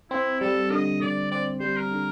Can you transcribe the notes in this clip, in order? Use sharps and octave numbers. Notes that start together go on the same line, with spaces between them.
C4 E4
G3 A4
D3 D#5
D3 D5
C4 D5
G3 C5
A#4
D3